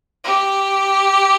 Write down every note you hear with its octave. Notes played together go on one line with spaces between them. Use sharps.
G4